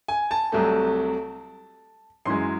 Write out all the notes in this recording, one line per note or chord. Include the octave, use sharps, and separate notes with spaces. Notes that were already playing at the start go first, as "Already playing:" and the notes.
G#5
A5
C2 C3 F#3 A3
F#2 E3 G#3 C6